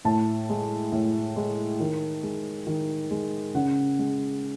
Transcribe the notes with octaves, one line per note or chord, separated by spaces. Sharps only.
A2 A5
G#3
A2
G#3
D#3
G#3
D#3
G#3
C#3 F#5
G#3